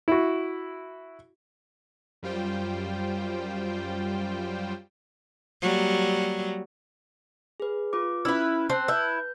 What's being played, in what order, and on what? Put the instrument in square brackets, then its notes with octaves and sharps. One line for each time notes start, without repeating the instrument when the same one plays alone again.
[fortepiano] E4 F#4
[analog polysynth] F#2 G3 F4 C5 G5
[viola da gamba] F#3 G3 A#3
[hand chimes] G#4 B4
F4 B4 D6
[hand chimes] C#4 F6 [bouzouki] E4 B4
[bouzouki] C4 [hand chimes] A5 F#6
[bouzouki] E4 [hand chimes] B4 G6